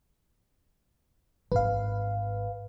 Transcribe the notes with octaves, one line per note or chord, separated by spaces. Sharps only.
G#1 B4 F5